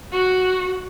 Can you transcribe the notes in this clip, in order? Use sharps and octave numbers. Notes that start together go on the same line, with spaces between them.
F#4